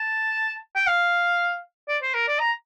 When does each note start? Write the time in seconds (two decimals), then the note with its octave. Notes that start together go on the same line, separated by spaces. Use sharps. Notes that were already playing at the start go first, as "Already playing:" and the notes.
Already playing: A5
0.76 G5
0.87 F5
1.89 D5
2.02 C5
2.14 A#4
2.28 D5
2.39 A#5